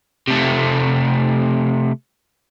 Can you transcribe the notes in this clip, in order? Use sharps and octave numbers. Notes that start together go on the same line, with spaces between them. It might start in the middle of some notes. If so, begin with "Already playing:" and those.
C3 A3